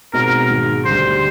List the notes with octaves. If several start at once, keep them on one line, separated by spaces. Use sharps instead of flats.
B2 G#3 C4 D#4 F#4 A#4
G#2 D#3 G#3
D2 D3 G3 C5